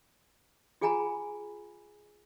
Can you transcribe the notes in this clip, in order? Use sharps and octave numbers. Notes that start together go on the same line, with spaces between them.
F4 G#4 F#5 G#5 A#5 B5